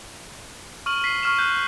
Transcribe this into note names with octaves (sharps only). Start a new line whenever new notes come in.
C#6 F6 D#7 F#7
B6 C7
C#6 F6 E7
F#6 G6